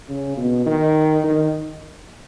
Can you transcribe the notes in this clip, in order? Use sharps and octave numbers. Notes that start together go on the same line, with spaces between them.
C#3
B2
D#3
D#3